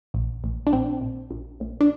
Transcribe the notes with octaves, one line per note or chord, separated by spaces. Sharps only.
A#1
A#1
D4
A#1 C4
A#1
A#1
A#1
D4